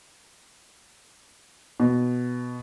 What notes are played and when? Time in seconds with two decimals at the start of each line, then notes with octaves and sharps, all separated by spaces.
1.80 B2